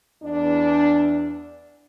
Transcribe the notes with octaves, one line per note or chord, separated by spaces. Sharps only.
E2 D4